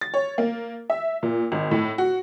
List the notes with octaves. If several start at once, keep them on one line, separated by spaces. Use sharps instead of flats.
A6
C#5
A#3
E5
A#2
G#1
A2
F#4